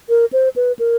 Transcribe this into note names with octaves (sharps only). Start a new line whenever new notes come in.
A#4
C5
B4
A#4